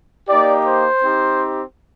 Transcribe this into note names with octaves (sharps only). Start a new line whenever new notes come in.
A#3 D#4 G4 D5
C5
C4 D#4 G4